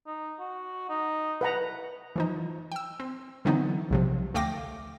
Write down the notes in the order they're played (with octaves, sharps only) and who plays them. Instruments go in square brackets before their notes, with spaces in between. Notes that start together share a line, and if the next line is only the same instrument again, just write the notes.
[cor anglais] D#4
F#4
D#4
[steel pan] B4 F#5 A#5
[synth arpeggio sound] E3 F3 D#4
G5 E6
C4
D3 E3 F#3 B3 C4 D#4
B1 C3 F3
D2 A3 F5 G5 D6 A#6